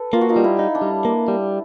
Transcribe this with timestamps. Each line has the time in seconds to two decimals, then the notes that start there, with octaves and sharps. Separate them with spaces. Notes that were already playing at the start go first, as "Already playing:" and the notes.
Already playing: A4 B4
0.13 A#3 F4
0.21 F#4
0.29 D#4 F4
0.36 G3
0.44 E4
0.59 D#4
0.75 D4
0.82 G3
1.05 A#3
1.28 G3